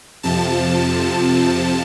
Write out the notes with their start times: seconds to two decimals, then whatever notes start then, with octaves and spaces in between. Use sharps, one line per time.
0.23 F2 C3 F3 A5